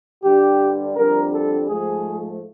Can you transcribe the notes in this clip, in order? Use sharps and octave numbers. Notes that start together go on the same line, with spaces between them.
G2 D3 G3 G4
F2 D3 G3 A#4
A4
G#2 F3 A3 G#4